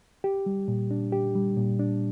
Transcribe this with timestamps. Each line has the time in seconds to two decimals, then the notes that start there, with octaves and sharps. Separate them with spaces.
0.24 G4
0.46 G3
0.68 A#2
0.91 D4
1.12 G4
1.35 G3
1.57 A#2
1.79 D4